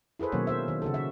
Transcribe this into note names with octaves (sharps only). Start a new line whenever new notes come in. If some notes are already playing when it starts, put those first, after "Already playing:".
E4 G#4 A4 B4 C5
B2 D#3 F#3 A#3 C#4 C#5
A#4 C5 E5
D#3
C#3 F#4 A4
E5